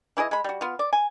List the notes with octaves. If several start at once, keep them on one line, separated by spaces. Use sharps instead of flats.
E3 E4 G#4 D#5
G#3 B5
G3 F#4
B3 F4
D5
G#5